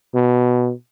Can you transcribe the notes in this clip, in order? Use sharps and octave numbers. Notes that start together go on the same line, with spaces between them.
B2